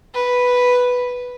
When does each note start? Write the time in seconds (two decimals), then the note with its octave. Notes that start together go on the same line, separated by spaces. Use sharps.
0.14 B4